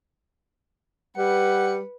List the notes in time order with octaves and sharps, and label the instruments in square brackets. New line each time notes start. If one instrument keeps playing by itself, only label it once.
[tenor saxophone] G3 [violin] B4 C#7 [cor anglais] F#5